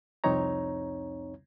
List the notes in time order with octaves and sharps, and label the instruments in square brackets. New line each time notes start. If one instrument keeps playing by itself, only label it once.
[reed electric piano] C2 F2 C4 D#4 C#5 A#5